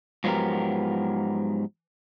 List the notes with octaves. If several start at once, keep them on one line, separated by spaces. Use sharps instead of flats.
G#2 F3 F#3 B3 G4 A#4